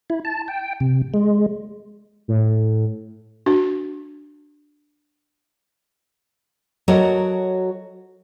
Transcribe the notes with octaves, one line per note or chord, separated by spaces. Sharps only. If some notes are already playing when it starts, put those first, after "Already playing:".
E4
A5
G5
C3
G#3
A2
D4 F#4
F#3 F#4 A4 A#4 C#5 D#5